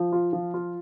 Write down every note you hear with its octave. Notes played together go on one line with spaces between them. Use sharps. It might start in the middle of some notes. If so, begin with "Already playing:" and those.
Already playing: F3
F4
F3
F4